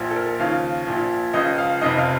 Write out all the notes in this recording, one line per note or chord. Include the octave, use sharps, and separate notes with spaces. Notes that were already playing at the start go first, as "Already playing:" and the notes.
Already playing: A#1 A#2 F3
A4
A#4
D#2 C#3 F3 F5
A#1 A#2 F3
C#2 C#3 F3 D#5
F5
F1 F2 C3 D#5
F5